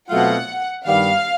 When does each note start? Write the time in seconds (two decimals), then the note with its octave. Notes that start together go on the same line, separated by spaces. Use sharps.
0.10 B2 F#3 A3 C4 F4 F#5
0.86 G2 D#3 G3 B3 F5